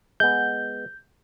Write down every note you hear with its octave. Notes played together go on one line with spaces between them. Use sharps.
G#3 B3 G6